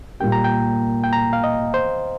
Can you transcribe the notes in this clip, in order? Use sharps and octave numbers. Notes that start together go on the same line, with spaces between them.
A#2 G3 A#3 G4 G5
A#5
G5
G5
A#5
F5
D#5
C5